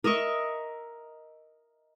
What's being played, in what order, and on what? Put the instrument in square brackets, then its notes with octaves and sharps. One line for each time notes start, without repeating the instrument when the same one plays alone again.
[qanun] A#4 D#5 E5 C#6